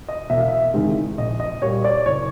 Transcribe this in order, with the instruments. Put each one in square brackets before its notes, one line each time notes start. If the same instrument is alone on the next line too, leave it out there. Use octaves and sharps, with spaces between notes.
[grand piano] D#5
E1 E5
F5
E5
E2 C3 D#3 G#3
A#1 D#5
D#5
A#2 G3 C#5
D5
F#1 C#5